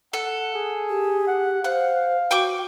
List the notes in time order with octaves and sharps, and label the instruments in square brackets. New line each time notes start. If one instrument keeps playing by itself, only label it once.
[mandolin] A4 [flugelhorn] F#5
[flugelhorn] G#4
[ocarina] G4
[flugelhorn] F#5
[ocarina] C5 [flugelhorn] F5 [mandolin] F#5
[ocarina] F#4 [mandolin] G5 C#6 D6